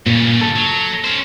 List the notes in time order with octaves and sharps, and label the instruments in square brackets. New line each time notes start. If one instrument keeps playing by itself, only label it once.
[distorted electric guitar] G2 C#3 [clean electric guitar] A#2
[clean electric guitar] A4
[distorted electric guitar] F#3
C#4 C5